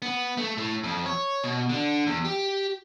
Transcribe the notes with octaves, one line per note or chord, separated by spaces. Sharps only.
B3
A3
A2
F2
C#5
B2
D3
E2
G4